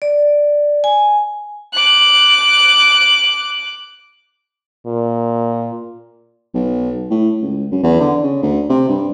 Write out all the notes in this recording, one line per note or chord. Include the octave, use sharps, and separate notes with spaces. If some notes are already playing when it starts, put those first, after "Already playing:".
D5
G#5
D6 F#6
A#2
B1
A2
C#2
F#2
E2
D3
C#3
D2
C3
G2